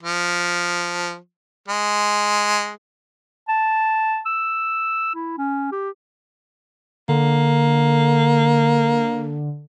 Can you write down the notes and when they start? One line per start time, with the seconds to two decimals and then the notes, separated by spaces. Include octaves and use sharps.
0.03 F3
1.68 G#3
3.49 A5
4.26 E6
5.15 E4
5.38 C#4
5.72 G4
7.09 D3 A#3